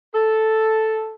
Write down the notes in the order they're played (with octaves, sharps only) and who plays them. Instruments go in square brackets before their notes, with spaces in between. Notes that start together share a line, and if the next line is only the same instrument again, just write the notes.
[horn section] A4